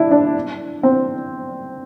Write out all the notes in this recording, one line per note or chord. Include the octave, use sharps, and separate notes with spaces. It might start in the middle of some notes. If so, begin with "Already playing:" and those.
Already playing: D4 E4
D4
C4